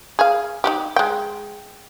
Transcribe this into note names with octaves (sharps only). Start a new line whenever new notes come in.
G#4 F5
D#4 F#4 G4
G#3 G5